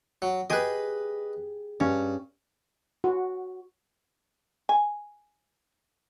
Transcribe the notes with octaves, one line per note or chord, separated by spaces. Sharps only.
F#3
G4 G#4 B4 D#5
G2 C#4
F#4
G#5